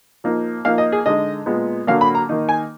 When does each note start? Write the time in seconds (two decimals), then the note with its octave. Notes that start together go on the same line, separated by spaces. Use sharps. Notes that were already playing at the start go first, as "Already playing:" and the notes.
0.24 F3 A#3 D#4
0.65 F3 A#3 D#4 F5
0.78 D#5
0.92 G#4
1.06 D3 G#3 D#4 D#5
1.46 A#2 G#3 B3
1.87 D3 F#3 A#3 F5
2.01 B5
2.15 A#5
2.29 D#3 A#3 D#4
2.49 G#5